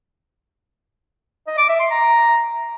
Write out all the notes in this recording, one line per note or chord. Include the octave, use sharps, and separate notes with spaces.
D#5
D6
E5
C6
A#5